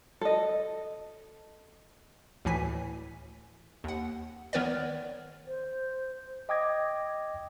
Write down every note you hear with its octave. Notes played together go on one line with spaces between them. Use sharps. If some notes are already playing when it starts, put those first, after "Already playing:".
A4 D#5
D2 A2 E3 G#5 B6
D#2 F#5
D#3 B3 A#4 B4 C#5 D5
C5
D#5 G5 D6 D#6 G#6 A#6